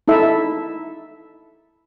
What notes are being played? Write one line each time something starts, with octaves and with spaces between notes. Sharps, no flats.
D#4 E4 A4 E5